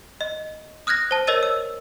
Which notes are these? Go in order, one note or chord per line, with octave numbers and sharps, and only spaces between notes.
D#5
D#6 F6 F#6 G#6 A#6
C5 A5
A#4 C#5 D#5 E6 A6 D#7
E6